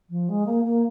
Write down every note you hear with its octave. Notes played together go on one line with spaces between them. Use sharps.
F3
G#3
A#3
A#3